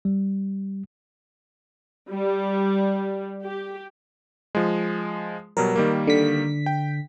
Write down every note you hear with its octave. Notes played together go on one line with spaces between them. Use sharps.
G3
G3
G4
F3 G#3
B2 F#3 G3 A#4
D#3 G3 A#3
D3 B6
G5